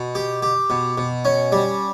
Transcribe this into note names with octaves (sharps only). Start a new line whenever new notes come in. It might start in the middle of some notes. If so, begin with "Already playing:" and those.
Already playing: B2
G4
G4
B2
B2
C#4
G3